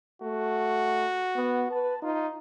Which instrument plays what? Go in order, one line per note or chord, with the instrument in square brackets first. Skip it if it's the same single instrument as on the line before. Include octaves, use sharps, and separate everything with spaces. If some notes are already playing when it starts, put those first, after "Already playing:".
[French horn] A3 [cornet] F#4
[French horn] B3
[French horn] B4 [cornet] A5
[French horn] D#4 [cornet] F4